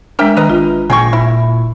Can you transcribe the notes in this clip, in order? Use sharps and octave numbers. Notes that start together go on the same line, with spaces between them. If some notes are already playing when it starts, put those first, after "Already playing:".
G#3 D4 A#4 E5 G5
D#3 B4 D#5 A#5
G#1 F4
A#2 G#4 G5 C#6
E1 E4